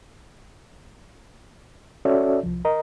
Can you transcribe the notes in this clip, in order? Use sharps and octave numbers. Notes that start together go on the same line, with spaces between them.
C#4 F#4 A4 C#5 D5 E5
C2 F3
A#4 D#5 A#5